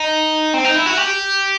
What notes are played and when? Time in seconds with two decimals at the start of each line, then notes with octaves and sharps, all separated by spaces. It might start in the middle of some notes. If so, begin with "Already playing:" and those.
Already playing: D#4
0.54 C4
0.65 D#4
0.76 E4
0.86 F#4
0.97 G4